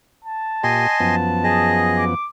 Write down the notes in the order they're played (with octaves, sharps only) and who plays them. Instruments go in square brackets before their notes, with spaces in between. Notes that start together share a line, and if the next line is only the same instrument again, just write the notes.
[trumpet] A5
[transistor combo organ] A#2 G4 [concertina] D#5 G#5 C6
[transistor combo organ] F#2 F3 B3
[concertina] G#4 D#5
[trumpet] D6